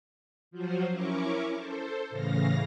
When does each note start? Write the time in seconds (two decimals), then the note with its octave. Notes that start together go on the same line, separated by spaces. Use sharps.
0.51 F3 F#3 F4 F#4 C5
0.91 C#4 E4 A#4 C#6 D6
1.57 A4 C5
2.10 A2 C#3 E3 F5 A#6